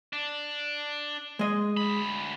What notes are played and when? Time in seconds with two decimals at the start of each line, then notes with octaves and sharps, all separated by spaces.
0.13 D4
1.39 G#3 D#5
1.77 D2 B5